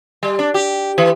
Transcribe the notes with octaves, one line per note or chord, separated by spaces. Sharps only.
G3
D4
G4
E3